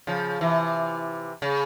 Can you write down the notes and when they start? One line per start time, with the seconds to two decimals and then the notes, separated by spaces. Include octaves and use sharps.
0.07 C#3 F3
0.41 C3 E3
1.42 C#3